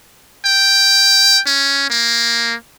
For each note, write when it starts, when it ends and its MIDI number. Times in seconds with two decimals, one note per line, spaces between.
0.45 1.41 79
1.46 1.87 61
1.90 2.54 58